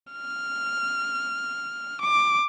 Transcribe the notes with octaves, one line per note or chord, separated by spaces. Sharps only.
F6
D6